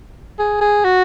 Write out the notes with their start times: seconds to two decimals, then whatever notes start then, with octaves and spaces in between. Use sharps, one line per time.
0.39 G#4
0.61 G#4
0.84 F#4